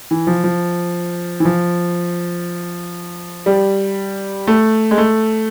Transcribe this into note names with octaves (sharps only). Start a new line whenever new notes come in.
E3
F3
F3
E3
F3
G3
A3
G#3
A3